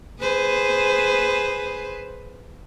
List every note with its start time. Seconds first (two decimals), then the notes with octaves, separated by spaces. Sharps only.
0.20 G#4 B4 C5